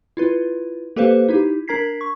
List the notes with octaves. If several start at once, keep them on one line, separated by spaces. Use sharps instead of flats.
E4 F4 B4
A#3 G4 A4 B4 C5 F5
D#4 E4 G4
D4 A#4 A#5 G#6 B6 C7
C#6